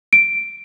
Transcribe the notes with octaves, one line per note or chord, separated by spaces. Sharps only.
D7